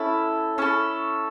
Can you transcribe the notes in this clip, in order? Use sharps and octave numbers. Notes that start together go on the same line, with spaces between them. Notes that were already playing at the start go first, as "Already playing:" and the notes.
Already playing: C#4 E4 A4
C#4 E4 A4